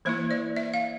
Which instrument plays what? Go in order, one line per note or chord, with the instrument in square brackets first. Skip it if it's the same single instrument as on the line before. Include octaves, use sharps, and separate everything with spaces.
[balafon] E3 A#3 E4 C5
D5
E5
F5